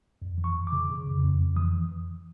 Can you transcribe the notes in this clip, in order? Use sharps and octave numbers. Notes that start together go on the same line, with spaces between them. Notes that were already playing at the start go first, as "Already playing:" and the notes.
F2
E3
C#6
F2
D6
C#3
C#3
F2
F2
F2
E3 D#6